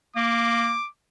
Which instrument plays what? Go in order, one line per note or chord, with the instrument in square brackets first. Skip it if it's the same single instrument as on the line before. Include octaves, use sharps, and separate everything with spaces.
[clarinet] A#3 [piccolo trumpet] D6